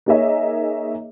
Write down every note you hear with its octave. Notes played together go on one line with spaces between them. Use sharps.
A#3 D#4 G#4 C#5 D#5 E5